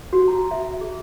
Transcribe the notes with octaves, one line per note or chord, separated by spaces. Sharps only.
F#4
A#5
E5
G#4